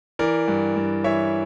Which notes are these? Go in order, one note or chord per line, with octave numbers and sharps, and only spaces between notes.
E3 A#4 D5
G2
G2
E3 C#5 E5